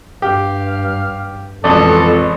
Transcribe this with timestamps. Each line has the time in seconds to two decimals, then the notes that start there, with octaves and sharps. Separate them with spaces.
0.22 G2 G4 F5
1.64 A1 F2 B2 E3 G#3 A4 D5